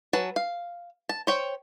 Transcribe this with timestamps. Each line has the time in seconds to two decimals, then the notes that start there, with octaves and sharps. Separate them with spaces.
0.13 F#3 B4 G#5 A5
0.36 F5
1.09 A5
1.27 C5 C#5 G5